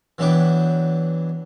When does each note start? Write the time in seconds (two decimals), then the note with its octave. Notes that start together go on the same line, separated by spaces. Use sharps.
0.18 E3 F#3 B3 D4 B4 G5